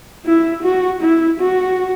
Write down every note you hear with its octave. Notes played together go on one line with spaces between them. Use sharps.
E4
F#4
E4
F#4